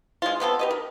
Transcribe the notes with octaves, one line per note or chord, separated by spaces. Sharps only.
G#3 F4
C3 B3 A4 C6
G4 B4 D#5
A#4